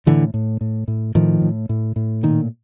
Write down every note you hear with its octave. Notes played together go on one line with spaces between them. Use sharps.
A2 D3 E3
A2
A2
A2
A2 D#3 F3
A2
A2
A2
A#2 D#3